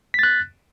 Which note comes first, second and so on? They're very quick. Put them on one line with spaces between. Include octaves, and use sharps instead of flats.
B6 A6 F#6